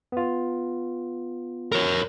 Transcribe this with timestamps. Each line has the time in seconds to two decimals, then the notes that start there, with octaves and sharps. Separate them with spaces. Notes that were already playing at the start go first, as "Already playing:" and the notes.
0.12 B3 F4
1.72 A#4 C#5